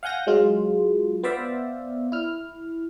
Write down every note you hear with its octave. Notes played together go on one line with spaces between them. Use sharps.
F5 F#5 G#5 G6 A#6
F#3 G#3 F4
B3 C5 D5 E5 F5
E4 F6